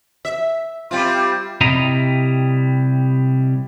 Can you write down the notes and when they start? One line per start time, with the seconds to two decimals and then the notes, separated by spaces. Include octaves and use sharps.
0.25 E5
0.91 G3 C4 F4
1.61 C3 G3 E4 D#5 A#5